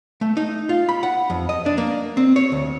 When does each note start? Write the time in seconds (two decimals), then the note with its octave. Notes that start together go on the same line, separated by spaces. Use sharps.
0.21 A3
0.37 D#4
0.69 F4
0.89 B5
1.03 F#5
1.30 F2
1.49 D#5
1.66 D4
1.78 A#3
2.17 C4
2.36 C#5
2.52 D2